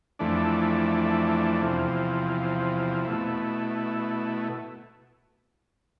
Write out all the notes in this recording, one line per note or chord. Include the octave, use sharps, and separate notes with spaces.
F2 E3 A3 D4
E2 C3 F3
B2 A3 E4